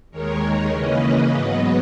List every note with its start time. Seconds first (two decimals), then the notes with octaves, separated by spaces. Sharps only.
0.11 D#2 D#3 G#3 A#4 C#5
0.71 C#3 E3 A#3 C#4 B4 D#5
1.32 G#2 F#3 B3